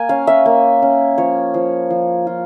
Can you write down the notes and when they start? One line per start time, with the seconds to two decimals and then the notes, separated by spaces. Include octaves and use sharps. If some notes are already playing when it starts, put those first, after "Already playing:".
Already playing: A#3 G#5
0.09 C#4 F5
0.27 E5
0.46 A#3
0.82 C#4
1.18 F3 C#5
1.54 F3
1.90 F3
2.27 F4